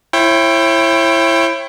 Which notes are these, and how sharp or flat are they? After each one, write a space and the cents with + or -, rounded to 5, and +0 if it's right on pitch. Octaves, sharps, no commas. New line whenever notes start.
E4 +20 C#5 -40 G5 +0